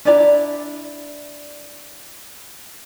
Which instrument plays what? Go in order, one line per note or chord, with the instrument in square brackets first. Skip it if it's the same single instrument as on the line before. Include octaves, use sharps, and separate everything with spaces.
[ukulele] D4 E4 D5 A#5